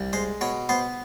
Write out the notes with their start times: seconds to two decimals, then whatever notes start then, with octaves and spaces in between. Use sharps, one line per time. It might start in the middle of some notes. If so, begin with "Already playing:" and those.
Already playing: C2
0.13 G#3 C5
0.41 B2 C#5
0.69 B3 C5